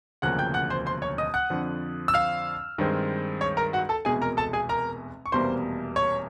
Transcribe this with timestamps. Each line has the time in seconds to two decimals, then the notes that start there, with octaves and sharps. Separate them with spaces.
0.22 E1 D2 C#3 F3 A#3 F#5 F#6
0.38 G5 G6
0.54 F#5 F#6
0.70 C5 C6
0.86 C5 C6
1.02 C#5 C#6
1.18 D#5 D#6
1.34 F#5 F#6
1.50 F2 D3 F3
2.08 E6
2.14 F5 F6
2.78 G2 D#3 G#3 C4
3.41 C#5 C#6
3.57 A#4 A#5
3.73 F#4 F#5
3.89 A4 A5
4.05 F1 E2 B2 G#3 G#4 G#5
4.22 A#4 A#5
4.37 A4 A5
4.53 G#4 G#5
4.69 A#4 A#5
5.26 C#6
5.32 F1 E2 B2 G3 A#3 C5 C6
5.96 C#5 C#6